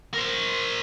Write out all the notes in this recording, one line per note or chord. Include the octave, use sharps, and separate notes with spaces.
A#4 C5